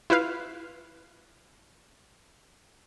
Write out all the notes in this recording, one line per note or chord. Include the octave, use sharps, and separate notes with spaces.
E4 F4 B4 F5